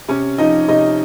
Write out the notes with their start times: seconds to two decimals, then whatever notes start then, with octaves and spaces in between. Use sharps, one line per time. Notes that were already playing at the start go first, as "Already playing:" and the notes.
0.08 C3 C#4 C#5
0.38 F3 D#4 D#5
0.68 C3 D#4 D#5